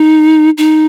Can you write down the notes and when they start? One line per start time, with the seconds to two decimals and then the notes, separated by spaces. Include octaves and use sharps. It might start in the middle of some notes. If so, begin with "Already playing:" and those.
Already playing: D#4
0.58 D#4